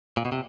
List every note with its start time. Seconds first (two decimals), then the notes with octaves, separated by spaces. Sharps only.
0.17 A#2
0.25 B2
0.32 C3